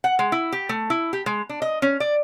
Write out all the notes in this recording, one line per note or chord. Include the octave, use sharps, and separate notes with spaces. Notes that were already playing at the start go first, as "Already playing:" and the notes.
F#5
G#3
E4
G4
A3
E4
G4
G#3
D4
D#5
C#4
D5